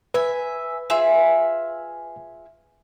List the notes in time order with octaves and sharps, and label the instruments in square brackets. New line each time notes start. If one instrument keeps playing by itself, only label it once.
[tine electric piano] B4 [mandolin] E5 G#5
[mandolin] F4 G#4 E5